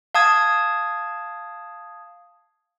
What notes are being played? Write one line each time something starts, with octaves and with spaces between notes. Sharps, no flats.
F5 A5 D#6 G#6